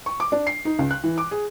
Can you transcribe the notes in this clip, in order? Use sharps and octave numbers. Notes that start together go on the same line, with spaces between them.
C#6
D6
D4
C7
D#4
C#2
F#6
E3
D6
G#4